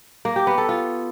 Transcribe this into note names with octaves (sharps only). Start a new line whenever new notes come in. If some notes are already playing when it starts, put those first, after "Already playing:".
A#3
G4
B3
A4
F4